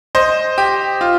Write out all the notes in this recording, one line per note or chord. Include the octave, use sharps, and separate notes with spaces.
C5 D#5
G4
F4